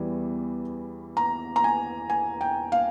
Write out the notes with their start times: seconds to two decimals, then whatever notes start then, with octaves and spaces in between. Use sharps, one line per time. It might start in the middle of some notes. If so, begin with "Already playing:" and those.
Already playing: E2 E3 G3
1.17 A#5
1.56 A#5
1.64 G#5
2.10 G#5
2.41 G5
2.72 F5